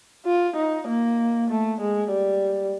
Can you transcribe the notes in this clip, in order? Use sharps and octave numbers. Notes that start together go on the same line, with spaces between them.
F4
D#4
A#3
A3
G#3
G3